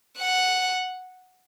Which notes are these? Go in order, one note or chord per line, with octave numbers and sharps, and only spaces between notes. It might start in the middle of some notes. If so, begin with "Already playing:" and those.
F#5